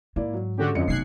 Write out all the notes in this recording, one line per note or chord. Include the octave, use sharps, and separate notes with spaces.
G#2 A#3 E4 D5
F#3
D3 G#3 A3 C#4 F#4 G4
F2 D3 F3 C#4 D#5 C#7
F1 B1 B3 F#6 G#6 C7